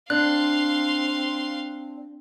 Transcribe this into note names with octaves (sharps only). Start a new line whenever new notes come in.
C4 D4 F5 C6 F#6